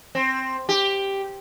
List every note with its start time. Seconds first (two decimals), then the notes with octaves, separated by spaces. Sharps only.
0.15 C4
0.69 G4